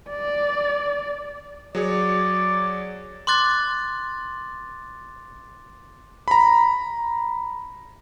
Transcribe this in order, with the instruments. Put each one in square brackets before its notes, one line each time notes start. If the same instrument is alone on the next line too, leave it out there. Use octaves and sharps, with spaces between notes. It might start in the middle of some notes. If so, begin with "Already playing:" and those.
[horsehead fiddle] D5
[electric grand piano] F#3 G#4 C#5 [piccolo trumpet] D5
[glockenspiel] C6 D6 F#6 A6
[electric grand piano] A#5 B5